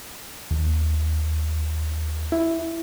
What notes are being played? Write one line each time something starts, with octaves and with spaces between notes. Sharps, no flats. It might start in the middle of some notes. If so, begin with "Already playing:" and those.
D#2
E4